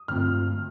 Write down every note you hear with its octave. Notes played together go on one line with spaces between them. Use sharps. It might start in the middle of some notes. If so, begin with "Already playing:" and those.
Already playing: D#6
G2 D3 A3 C4 F4 F6